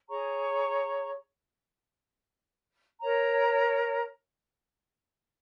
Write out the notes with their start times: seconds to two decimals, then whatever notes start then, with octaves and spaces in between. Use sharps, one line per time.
0.09 G#4 C#5 A#5 C#6
3.01 A#4 C#5 A#5